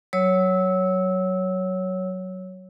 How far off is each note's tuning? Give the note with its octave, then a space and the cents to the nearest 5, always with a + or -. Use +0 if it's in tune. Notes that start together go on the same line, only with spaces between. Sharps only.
F#3 +15 C#5 +0 E6 -20